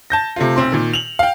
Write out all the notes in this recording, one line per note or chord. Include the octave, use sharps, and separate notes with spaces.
A5 G6 A#6
C3 A3 F4
B1 C4 C6
A#2 D#3
F7 F#7
F5 G5